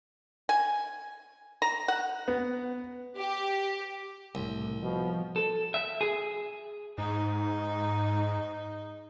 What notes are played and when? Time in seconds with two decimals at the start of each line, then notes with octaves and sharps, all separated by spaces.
0.49 G#5
1.62 A#5
1.88 F#5
2.28 B3
3.18 G4
4.35 C2 A2
4.83 B2 F3
5.36 A4
5.74 E5
6.01 G#4
6.98 G#2 D#4